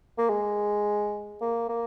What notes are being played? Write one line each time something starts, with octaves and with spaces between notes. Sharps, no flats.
A#3
G#3
A#3
A#3